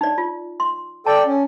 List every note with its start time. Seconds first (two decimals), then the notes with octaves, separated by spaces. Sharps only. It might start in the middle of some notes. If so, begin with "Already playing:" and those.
0.01 D#4 D5
0.18 F4
0.60 C6
1.06 A4 D5 G5 A5
1.26 C#4